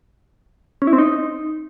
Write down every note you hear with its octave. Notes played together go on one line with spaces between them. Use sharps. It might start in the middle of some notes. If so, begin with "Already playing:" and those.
C#4
E4
C4
D#4